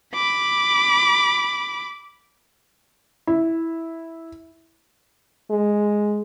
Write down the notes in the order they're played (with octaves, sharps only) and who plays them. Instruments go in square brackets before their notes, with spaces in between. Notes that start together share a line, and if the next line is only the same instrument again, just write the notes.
[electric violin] B5 D6
[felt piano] E4
[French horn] G#3